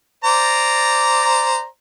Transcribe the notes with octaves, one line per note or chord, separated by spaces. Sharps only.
C5 D5 A#5